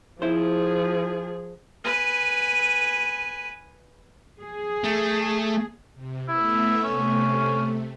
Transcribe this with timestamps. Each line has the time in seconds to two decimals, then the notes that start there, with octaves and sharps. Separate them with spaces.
0.22 F3 E4 G#4 C5
1.84 B4 G#5
4.42 G#4
4.84 A3
5.95 C3
6.28 A3 B3 E4 E5
6.83 C3 A3 C#4